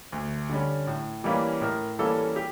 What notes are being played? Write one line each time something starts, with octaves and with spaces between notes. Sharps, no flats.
D2
D3 G3 C#4
A2
E3 G3 A#3 C#4
A2 A#4
E3 G3 A#3 C#4 A4
G4